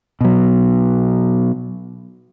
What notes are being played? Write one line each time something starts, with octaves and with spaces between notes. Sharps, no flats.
B2 F#3